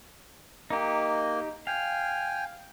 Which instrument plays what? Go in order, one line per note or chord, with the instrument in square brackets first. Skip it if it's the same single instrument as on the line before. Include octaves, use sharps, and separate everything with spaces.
[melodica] A#3 [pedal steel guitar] D#4 G4
[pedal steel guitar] F5 [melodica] G5 G#5